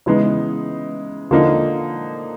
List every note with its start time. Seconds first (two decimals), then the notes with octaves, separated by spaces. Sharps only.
0.06 C#3 E3 G#3 B3 D#4
1.31 D3 F3 A#3 D#4